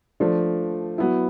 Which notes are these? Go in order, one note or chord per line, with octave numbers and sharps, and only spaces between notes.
F3 A3 D4
F#3 B3 E4